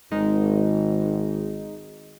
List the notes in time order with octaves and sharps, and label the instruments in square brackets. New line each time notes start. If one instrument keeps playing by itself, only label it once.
[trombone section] G#1 [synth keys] G#3 D#4